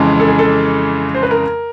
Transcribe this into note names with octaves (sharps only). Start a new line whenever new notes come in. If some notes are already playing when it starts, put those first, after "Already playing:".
Already playing: F2 C#3 E3 G#3
A4
G#4
A4
C5
B4
A#4